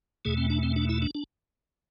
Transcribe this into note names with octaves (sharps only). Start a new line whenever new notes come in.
E2 B2 A3 G#4
C4
D4
C4
D4
E4
D4
D4